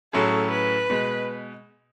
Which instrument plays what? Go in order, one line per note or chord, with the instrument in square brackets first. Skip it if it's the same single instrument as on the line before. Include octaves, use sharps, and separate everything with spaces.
[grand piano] A2 F#3 C#4 E4 G#4 [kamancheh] A4
[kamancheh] B4
[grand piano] B2 G#3